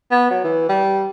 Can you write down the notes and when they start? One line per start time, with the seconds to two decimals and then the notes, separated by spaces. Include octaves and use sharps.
0.11 B3
0.30 F#3
0.44 E3
0.69 G3